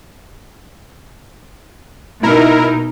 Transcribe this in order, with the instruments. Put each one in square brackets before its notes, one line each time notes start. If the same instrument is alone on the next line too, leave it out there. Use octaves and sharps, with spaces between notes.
[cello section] B2 D#4 [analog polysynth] E4 A#4